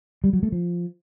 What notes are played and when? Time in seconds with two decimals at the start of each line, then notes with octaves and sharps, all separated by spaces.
0.24 G3
0.33 F#3
0.43 A3
0.52 F3